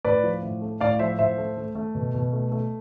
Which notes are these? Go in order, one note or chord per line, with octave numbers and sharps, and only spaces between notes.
A2 B4 D5
F3
A2
A3
A2 D5 F5
F3 C5 E5
A2 C5 E5
A3
A3
A3
B2
B2
A3
A3